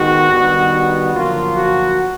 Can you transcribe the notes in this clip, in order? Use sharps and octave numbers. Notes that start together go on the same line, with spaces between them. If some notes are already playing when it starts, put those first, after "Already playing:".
Already playing: G#2 D#3 G#3 B3 F#4
G2 D#3 G3 B3
F#2 D3 F3 A#3 F4
F#4